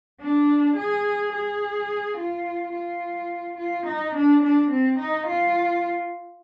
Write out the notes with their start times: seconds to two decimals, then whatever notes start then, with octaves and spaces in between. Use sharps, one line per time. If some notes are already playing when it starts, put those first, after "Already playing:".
0.21 D4
0.77 G#4
1.33 G#4
2.18 F4
2.74 F4
3.58 F4
3.87 D#4
4.15 D4
4.43 D4
4.71 C4
4.99 D#4
5.27 F4